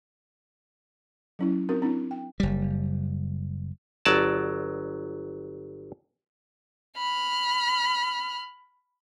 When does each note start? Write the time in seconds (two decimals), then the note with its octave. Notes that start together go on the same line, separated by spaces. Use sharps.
1.39 F#3 C#4 E4
1.69 C4 D#4 F#4 A#4
1.82 C4 D4 E4
2.11 G5
2.40 F#1 G3
4.05 G1 F#3 D5 A5
6.97 B5 F6